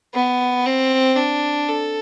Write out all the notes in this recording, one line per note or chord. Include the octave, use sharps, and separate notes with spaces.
B3
C4
D4
A4